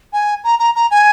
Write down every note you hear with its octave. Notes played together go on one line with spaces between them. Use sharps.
G#5
A#5
A#5
A#5
G#5